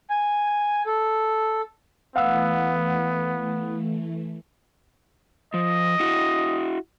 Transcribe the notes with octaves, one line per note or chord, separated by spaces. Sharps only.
G#5
A4
E3 A3 B3 F5 F#5 E6
F3 D#5
E4 F#4